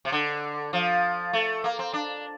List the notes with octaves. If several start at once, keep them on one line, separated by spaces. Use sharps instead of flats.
C3
D3
F3
A3
A#3
C4
D4